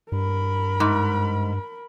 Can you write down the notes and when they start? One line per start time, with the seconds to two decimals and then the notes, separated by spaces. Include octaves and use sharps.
0.12 G2 A#4 B5
0.80 G#2